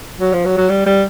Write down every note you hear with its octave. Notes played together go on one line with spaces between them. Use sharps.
F#3
F3
F#3
F#3
G3
G3